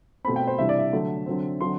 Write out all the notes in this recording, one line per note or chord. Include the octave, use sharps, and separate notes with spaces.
B2 A3 C4 B5
G5
C5
C3 E3 G3 D4 E5
D5
E5
D3 F#3 A3
D3 F#3 C4
D3 F#3 C4 C6